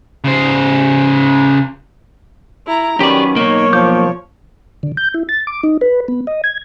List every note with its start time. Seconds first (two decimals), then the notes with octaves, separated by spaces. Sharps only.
0.24 C#3 C5
2.67 E4 A#5
3.00 D#3 F#3 C#4 G4 B4 D5
3.36 B1 A#3 D#4 C#5
3.73 F3 D6 G6
4.83 D3
4.97 G6
5.14 E4
5.29 A6
5.47 D6
5.63 D#4
5.81 B4
6.08 B3
6.27 D#5
6.44 G#6